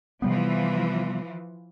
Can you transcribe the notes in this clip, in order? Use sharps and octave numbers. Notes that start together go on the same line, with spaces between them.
C3 E3 F3 G3 B3